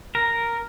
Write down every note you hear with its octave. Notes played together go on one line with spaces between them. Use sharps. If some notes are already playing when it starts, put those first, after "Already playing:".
A#4